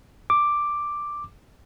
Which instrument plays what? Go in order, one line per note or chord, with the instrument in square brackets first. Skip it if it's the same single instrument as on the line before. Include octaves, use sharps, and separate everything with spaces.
[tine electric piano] D6